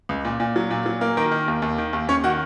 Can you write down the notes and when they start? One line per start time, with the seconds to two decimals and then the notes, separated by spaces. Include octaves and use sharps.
0.09 C#2
0.25 A#2
0.40 A#2
0.56 F#3
0.70 A#2
0.86 F#3
1.01 A#3
1.17 D#3 A#4
1.31 D#3
1.48 D#2
1.62 D#2
1.78 D#3
1.93 D#2
2.08 D#2 C#4 C#5
2.24 D#3 F#4 F#5